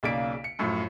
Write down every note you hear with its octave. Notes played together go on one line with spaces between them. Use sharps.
B1 C#3 A#3 D5 B6 D7
C#7
F#2 A2 F3